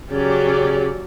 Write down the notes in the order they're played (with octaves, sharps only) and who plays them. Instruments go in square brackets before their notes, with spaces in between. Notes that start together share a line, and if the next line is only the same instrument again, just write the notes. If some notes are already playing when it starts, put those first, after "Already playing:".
[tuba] C#3 [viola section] F#3 C#4 G4 D5